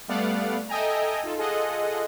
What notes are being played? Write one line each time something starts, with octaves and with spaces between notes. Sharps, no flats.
G3 A3 B3 D5 F5 F#5
A4 D#5 E5 G5 G#5 A#5
D#4 F4 A4
F4 G#4 A4 D#5 F#5